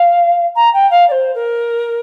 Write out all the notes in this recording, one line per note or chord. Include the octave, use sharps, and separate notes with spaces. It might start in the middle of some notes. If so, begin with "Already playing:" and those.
Already playing: F5
A#5
G5
F5
D5
C5
A#4